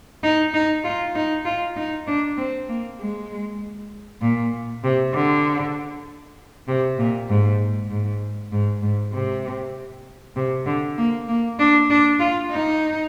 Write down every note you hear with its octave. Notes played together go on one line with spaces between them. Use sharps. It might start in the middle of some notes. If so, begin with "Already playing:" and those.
D#4
D#4
F4
D#4
F4
D#4
D4
C4
A#3
G#3
A#2
C3
D3
C3
A#2
G#2
G#2
G#2
G#2
C3
C3
D3
A#3
A#3
D4
D4
F4
D#4